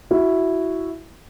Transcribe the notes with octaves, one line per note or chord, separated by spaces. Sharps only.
E4 F#4